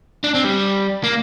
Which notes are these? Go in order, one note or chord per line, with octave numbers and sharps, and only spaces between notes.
D4
C4
G3
A#3